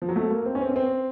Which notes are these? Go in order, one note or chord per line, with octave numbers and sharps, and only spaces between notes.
F3
F#3
A3
A#3
C4
C#4
C4
C#4
C4